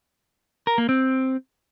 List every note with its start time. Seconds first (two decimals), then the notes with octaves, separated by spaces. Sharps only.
0.67 A#4
0.78 A#3
0.89 C4